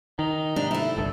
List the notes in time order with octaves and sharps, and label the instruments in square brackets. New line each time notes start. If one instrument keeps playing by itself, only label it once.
[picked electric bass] D#3 [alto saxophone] D#4
[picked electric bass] G#2 C3 [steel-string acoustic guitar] D4
[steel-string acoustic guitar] A3 E4
[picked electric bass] G1 C2 G2 [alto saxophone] A4